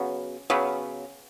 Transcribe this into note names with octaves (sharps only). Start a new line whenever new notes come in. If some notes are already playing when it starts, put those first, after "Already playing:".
Already playing: C#3 F#3 B3
C#3 F#3 B3